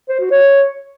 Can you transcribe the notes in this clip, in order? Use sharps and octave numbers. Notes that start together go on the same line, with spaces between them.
C5
F#4
C#5